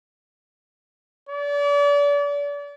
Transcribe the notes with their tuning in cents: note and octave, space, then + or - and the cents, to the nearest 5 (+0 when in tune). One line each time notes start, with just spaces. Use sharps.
D5 -35